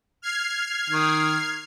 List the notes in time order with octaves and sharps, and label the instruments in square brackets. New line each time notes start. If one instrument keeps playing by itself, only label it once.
[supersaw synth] F6 G#6 C7
[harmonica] D#3